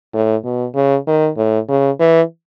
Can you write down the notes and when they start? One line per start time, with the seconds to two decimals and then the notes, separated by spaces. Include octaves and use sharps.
0.14 A2
0.45 B2
0.75 C#3
1.07 D#3
1.37 A2
1.68 C#3
1.99 E3